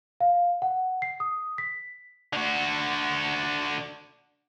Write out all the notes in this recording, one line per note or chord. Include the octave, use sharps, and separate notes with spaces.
F5
F#5
C7
D#6
B6
D3 F#4